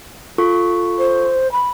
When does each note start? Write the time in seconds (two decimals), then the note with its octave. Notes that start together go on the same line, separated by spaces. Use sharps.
0.38 F4 A4 C#6
0.98 C5
1.51 B5